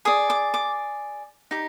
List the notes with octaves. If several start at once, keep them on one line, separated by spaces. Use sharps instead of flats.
G#4 D5 D#6
D6
D6
D#4 G4